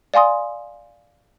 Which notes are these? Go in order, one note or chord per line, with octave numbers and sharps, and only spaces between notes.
D5 F5 G#5 C6 D#6